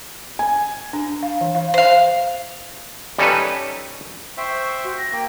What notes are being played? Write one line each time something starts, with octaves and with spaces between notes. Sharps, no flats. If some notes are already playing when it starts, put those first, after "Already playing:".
G#5
D4
F5
E3
F5
C5 F5
G3 C#4 D#4 A4 B4
C5 E5 G5 C#6
F#4
A#6
A#3 G5